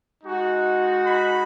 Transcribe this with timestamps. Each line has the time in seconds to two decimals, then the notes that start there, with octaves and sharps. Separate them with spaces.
0.23 G#3 D#4 F#4
1.07 B5